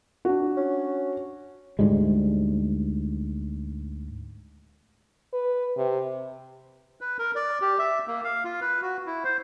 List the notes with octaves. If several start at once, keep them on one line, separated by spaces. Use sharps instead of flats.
D4 F#4
C#4
D2 G#2 G3 G#3
B4
C3
B4
A#4
D5
G4
E5
A#3
F5
F4
B4
F#4
E4
C5